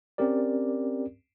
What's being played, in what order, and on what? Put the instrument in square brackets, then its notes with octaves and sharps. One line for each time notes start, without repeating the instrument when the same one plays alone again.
[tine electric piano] C4 C#4 G4 A#4 D5